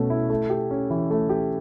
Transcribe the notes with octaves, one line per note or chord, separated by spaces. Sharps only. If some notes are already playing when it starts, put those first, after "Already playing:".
Already playing: B2 A3 C#4
E4
A3
G4
C#4
E3
A3
G4